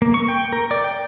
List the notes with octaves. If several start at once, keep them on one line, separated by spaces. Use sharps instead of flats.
A#3
C#6
G5
A#4
D5
G5